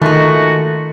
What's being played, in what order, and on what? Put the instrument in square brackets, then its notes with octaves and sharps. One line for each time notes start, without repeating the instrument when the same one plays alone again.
[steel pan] D#3 [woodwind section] G#3 F4 F#4 [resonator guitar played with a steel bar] A3 D#4